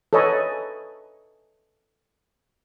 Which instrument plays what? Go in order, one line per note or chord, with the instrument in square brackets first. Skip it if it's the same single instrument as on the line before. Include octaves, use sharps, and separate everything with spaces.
[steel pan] A4 B4 C#5 D#5 G#5 B5